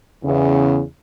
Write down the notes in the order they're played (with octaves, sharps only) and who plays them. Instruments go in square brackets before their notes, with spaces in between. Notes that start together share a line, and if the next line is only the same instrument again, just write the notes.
[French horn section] E2 C#3